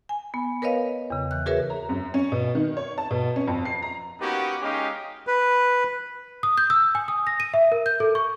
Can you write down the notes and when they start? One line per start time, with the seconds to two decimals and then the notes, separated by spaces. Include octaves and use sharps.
0.09 G#5
0.34 B3
0.62 A#4 B4 C#5 D#5 F5
1.10 E2 C#3
1.31 E3 F#6
1.46 F#4 G#4 A#4 B4 C#5 E5
1.70 A#5
1.89 F#2
2.14 C#4
2.32 B2
2.55 D#3
2.77 C#5
2.98 A5
3.11 B2
3.36 C#4
3.48 F2
3.65 C7
3.82 A#5
4.21 A#3 B3 C#4 D#4 F#4 G4
4.62 G#3 C#4 D#4 G4 D#5 F5
5.27 B4
6.43 D#6
6.58 G6
6.70 E6
6.95 G#5
7.08 D#6
7.27 A#6
7.40 D#7
7.54 E5
7.72 A#4
7.86 G6
8.00 A4
8.15 C#6